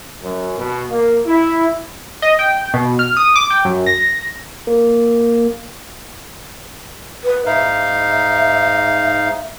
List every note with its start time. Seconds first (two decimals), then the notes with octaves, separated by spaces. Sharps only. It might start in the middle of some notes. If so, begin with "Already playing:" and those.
0.22 F#2
0.57 B2
0.90 A#3
1.26 E4
2.22 D#5
2.39 G5
2.74 B2
2.99 F6
3.17 D#6
3.36 D6
3.50 G5
3.65 F#2
3.86 A#6
4.67 A#3
7.24 B4
7.46 G#2 D#4 E5 F5